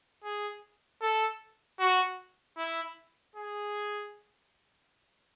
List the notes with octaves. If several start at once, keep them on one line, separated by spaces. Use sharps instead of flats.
G#4
A4
F#4
E4
G#4